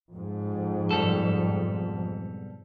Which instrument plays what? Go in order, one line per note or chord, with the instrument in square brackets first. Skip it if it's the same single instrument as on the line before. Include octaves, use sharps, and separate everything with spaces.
[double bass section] F2 G#2
[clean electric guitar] B1 G3 A4